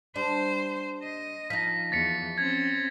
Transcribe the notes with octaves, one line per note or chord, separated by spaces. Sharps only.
G3 D4 C5
D#5
F3 D#4 A#6 B6
E2 A6 B6 C#7
C4 C#4 G#6